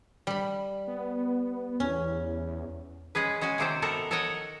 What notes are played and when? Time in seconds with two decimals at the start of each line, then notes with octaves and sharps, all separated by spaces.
0.27 G3 B5
0.87 B3
1.80 E2 C#4
3.15 G#3 C#4 G#4 B4
3.41 G#3 C#4 F#4 G#5
3.58 C3 D#3 A#3 C4 A4 C5
3.82 B3 A4 A#4 F5 F#5
4.11 A4 A#4 C#5 D#5 F#5